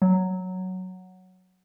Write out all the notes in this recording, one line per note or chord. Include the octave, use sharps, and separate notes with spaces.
F#3